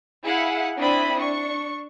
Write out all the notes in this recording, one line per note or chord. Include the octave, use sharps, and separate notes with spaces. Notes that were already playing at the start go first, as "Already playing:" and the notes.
E4 G#4 F5 F#5
C4 D4 E4 B5 D#6
D4 C#6